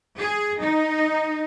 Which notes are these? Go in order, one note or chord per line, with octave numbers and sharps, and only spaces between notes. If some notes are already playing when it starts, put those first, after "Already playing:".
G#4
D#4